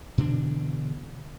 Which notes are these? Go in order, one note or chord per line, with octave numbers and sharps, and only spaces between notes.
B2 D3 E3 D4